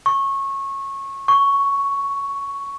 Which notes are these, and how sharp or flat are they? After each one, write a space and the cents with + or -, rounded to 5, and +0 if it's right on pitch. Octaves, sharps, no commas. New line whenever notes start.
C#6 -20
C#6 +5